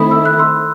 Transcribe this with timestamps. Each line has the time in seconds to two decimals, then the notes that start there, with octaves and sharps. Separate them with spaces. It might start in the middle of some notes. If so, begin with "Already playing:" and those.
Already playing: D#3 A3 C4 E4 B5 D#6
0.11 E6
0.25 F#6
0.39 C6 E6